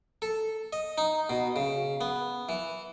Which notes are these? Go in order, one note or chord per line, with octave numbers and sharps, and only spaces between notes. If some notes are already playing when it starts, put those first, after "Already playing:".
A4
D#5
D#4
B2
C#3
B3
E3